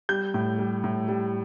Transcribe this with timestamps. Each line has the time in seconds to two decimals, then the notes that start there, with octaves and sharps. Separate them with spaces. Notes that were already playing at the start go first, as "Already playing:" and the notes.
0.09 G3 G6
0.34 A2
0.59 G3
0.84 A2
1.08 G3